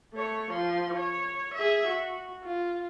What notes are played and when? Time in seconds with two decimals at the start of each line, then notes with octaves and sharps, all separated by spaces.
0.13 A3 C#5
0.51 F3 C6
0.97 C#5
1.55 G#4 E5
1.88 F#4
2.44 F4